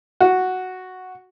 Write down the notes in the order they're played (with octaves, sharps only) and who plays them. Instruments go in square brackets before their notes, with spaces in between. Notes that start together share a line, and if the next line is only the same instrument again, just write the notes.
[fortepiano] F#4